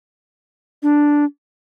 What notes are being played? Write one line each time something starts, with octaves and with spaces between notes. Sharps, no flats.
D4